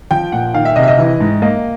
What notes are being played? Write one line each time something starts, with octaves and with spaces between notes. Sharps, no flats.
F3 G5
A#2 F#5
D#3 F5
E5
C3 D#5
E5
D#5
E3
G#2
A#3 D#5